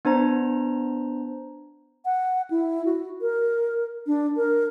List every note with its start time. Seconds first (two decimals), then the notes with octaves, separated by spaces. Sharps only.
0.05 B3 D4 C5 A#5
2.05 F#5
2.51 E4
2.85 F#4
3.21 A#4
4.07 D4
4.37 A#4